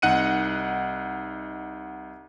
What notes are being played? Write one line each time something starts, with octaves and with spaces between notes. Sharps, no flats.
C2 D#4 F#5 F#6 C#7 D#7